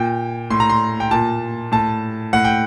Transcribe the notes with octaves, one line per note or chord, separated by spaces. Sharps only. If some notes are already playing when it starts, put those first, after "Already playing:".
Already playing: A#2 G5
A2 C6
A#5
C6
G5
A#2 A5
A2 A5
A2 F#5
G5